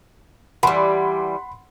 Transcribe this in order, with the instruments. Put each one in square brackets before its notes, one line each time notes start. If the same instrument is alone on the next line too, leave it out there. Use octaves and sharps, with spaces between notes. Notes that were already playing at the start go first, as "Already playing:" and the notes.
[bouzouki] E3 G3 [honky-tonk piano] F#5 B5 C6